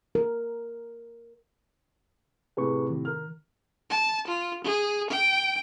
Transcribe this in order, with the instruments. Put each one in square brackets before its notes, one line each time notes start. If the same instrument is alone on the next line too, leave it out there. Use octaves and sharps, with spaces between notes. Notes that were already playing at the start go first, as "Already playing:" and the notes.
[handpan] A#4
[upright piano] A2 C3 [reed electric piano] G#4 B4 C#6
[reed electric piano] D#3
[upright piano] A#4 F6
[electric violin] A5
F4
G#4
G5